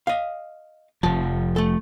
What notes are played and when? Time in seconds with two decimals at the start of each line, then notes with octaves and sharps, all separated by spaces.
0.07 D#5 F5
1.03 F1 F3 A5
1.56 A3 A4